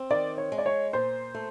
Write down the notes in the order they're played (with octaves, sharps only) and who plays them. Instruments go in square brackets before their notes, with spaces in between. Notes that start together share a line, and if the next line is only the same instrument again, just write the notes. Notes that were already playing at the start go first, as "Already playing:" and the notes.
Already playing: [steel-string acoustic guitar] C4
[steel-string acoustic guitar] D#3 [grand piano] D5
[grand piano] C#5
[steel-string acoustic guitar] G#3
[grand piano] D5
C#5
[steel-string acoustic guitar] A#2 [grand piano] C5
[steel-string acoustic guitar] A3